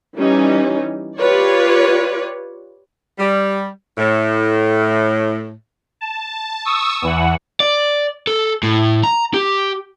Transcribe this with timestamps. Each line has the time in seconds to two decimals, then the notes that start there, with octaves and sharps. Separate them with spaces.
0.17 E3 G3 C#4 D#4
1.18 F4 G4 B4 C#5 D5
3.19 G3
3.98 A2
6.01 A5
6.65 C#6 D#6 E6
7.02 E2 E3 F#5
7.60 D5
8.27 A4
8.63 A2
9.04 A#5
9.34 G4